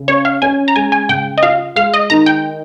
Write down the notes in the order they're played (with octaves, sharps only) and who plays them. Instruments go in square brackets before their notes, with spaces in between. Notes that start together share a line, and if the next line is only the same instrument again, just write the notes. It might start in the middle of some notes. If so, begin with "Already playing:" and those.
Already playing: [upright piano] C#3
[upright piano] C#4 [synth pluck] C#5
[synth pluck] F5
[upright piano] C#4 [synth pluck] G#5
[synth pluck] A#5
[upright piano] G#3 [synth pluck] G#5
[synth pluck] G#5
[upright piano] C#3 [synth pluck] G5
[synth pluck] D#5
[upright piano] F4 [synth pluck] F5
[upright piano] G#3 [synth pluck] F5
[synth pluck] D#5
[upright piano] D#3 [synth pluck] A#5
[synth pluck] G5